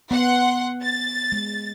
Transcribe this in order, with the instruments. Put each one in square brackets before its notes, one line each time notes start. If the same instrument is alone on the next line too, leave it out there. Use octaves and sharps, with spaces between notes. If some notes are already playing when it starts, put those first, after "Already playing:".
[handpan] B3 [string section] F#5 C6
[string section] A6
[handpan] G#3